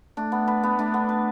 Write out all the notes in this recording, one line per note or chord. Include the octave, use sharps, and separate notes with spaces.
A3 D4
B3
B4
B3
A3 D4
B3
B4